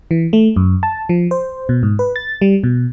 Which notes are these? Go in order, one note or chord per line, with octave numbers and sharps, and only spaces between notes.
E3
A3
F#2
A5
F3
C5
B2
G#2
B4
A6
G3
B2